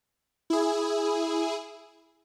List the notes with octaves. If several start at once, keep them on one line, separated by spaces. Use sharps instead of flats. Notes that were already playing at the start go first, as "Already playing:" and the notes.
E4 G#4